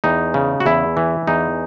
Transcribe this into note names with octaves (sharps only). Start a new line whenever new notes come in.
E2 D#4
C#3
F#4
E2 E4
E3
E2 D#4